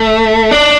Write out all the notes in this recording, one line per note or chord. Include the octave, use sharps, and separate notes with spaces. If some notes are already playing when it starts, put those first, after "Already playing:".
Already playing: A3
D4